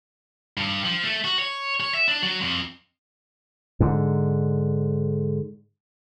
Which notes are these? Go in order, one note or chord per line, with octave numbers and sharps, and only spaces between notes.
G2
F3
A3
F#4
C#5
C#5
E5
D4
F#3
F2
G#2 D3